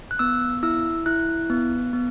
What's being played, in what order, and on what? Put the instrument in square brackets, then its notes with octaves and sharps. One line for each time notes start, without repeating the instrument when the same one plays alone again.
[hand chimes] F#6
B3 E6
E4 E6
E4 F#6
B3
B3